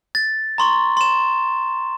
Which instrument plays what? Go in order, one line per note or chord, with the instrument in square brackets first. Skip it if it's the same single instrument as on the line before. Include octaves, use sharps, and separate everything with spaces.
[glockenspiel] A6
A#5 C6 C#6
C6 E7